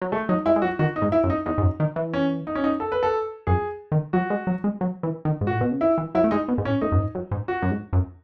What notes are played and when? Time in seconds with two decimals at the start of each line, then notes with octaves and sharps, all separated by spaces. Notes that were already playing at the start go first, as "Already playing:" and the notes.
0.02 F#3
0.12 G#3 A3
0.29 F#3 D#4
0.45 G#3 E4
0.56 G#3
0.62 F#3 F#4
0.79 D#3 F#4
0.96 D#4
1.02 G#2
1.12 E4
1.24 F#2
1.30 D#4
1.46 E2 D#4
1.58 G#2
1.62 F#2
1.80 D#3
1.96 E3
2.13 C#4
2.47 D#4
2.55 C#4
2.64 D#4
2.80 A4
2.92 B4
3.03 A4
3.47 F#2 G#4
3.92 D#3
4.13 F#3 F#4
4.30 G#3
4.47 F#3
4.64 G#3
4.81 F#3
5.03 E3
5.25 D#3
5.41 G#2
5.47 A2 F#4
5.61 B2
5.71 C#3
5.81 D#3 E4
5.98 E3
6.15 F#3 E4
6.24 A3
6.31 G#3 D#4
6.48 B2
6.58 G#2
6.65 A2 C#4
6.81 A2 D#4
6.92 F#2
6.98 G#2
7.15 F#2
7.31 G#2
7.48 F#4
7.62 F#2
7.71 G#2
7.93 F#2